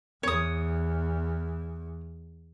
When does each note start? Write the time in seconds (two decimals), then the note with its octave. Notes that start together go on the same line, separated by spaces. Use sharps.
0.23 E2 C#5 D#6